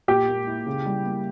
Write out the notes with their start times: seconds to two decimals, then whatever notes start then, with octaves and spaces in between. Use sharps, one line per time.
0.08 A#2 G4
0.28 A#3
0.47 E4
0.66 C#3
0.85 G3
1.05 A#3